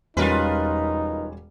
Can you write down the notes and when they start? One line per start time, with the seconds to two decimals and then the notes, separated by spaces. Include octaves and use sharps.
0.17 E1 E2 G3 C#4 D#4 F4 A#4 B4